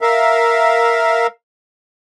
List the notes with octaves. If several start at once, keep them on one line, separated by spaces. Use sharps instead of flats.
A#4 E5 F5